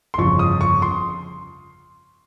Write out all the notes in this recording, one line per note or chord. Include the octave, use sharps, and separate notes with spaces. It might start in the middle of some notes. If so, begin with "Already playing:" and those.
C6
G1 F2 C#3 F3 C#6
D#6
C#6
C6